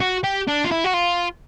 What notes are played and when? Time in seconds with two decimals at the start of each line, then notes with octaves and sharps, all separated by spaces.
0.01 F#4
0.24 G4
0.47 D4
0.64 F4
0.71 E4
0.84 F#4
0.94 F4